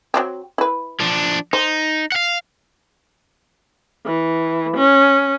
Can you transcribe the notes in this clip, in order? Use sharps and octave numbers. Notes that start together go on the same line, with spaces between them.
F#3 C4 G4
E4 B4
F3 D4
D#4 C5
F5 F#5
E3
C#4